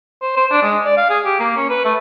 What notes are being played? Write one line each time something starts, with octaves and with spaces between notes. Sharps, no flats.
C5
C5
D4
G#3
D5
F5
G#4
G4
A#3
C#4
B4
A3